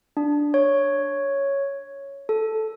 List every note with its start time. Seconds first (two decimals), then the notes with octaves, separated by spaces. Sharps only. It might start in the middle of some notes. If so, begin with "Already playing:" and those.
0.17 D4
0.54 C#5
2.29 A4